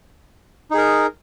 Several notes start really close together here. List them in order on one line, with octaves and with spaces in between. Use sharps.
D#4 G#4 A#4